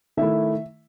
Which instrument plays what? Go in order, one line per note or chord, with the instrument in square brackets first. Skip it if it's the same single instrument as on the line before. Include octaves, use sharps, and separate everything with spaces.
[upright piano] D#3 A3 E4 E5